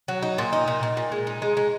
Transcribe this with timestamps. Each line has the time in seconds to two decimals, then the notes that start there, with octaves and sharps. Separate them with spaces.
0.08 F#3
0.23 D#4
0.38 A#2
0.53 D#4
0.68 A#2
0.83 A#2
0.97 A#2
1.12 G#3
1.27 D#4
1.42 G#3
1.57 G#3